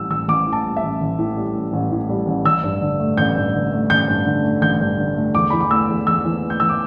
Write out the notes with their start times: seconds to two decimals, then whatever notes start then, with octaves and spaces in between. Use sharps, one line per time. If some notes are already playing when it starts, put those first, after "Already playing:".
Already playing: A1 A2 G3 E6
0.10 A1 E6
0.28 A1 D6
0.47 A2
0.53 A5
0.65 G3
0.77 E5
0.83 A1
1.01 A1
1.19 A2
1.37 G3
1.55 A1
1.73 A1
1.91 A2
2.09 G3
2.27 A1
2.45 A1 E6
2.64 G2
2.82 D3
2.99 A3
3.17 A1 G6
3.36 G2
3.54 D3
3.71 A3
3.90 A1 G6
4.08 G2
4.26 D3
4.44 A3
4.62 A1 G6
4.81 G2
4.98 D3
5.16 A3
5.35 E2 D6
5.50 E3 B5
5.60 D6
5.71 A3 E6
5.89 E2
6.07 E2 E6
6.25 E3
6.43 A3
6.50 G6
6.60 E2 E6
6.69 D6